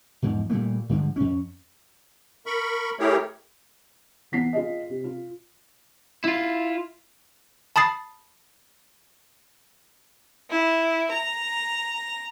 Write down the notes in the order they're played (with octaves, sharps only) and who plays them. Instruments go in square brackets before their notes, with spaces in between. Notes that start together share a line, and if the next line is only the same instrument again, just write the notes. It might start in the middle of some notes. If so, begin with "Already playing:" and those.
[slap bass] E2 G#2 F3
A#2 G3 A3 A#3
G2 D3 F3 G#3
F2 C#4
[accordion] A#4 B5 C#6
A3 E4 G4 G#4 A#4 C#5
[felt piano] E3 B3 B6 C7
F4 G#4 D#5
C3
F4
[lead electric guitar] E4 F4
[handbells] A5 B5 D#6 A6 C7
[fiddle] E4
A#5